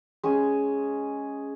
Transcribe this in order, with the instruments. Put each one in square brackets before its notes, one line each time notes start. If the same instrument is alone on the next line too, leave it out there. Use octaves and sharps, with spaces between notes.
[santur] G#3 C#4 G#4